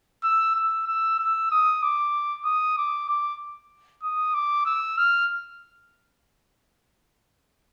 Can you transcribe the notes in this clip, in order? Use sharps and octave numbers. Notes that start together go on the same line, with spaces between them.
E6
E6
E6
E6
D#6
D6
D#6
D6
D6
D#6
D6
E6
F6